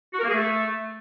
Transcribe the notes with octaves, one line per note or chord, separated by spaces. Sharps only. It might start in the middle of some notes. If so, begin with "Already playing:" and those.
F#4
A#4
A#3
G#4
A3